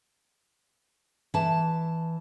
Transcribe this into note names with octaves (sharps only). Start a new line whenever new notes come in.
E3 A5